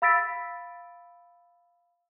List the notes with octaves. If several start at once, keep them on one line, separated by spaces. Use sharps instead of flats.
F5 B5 E6 A6 B6 D7